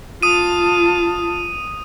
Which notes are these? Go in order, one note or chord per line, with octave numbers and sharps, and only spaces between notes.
F4 A5 D#6 D#7